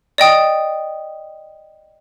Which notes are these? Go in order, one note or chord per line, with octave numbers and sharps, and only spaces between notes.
D5 D#5 G5 D#6